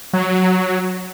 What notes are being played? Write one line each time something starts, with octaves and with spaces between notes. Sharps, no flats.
F#3